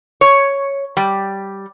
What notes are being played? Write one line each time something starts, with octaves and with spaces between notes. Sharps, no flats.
C#5
G3